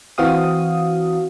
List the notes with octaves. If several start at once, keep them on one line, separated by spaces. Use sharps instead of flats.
E3 C4 F#4 F5 D#6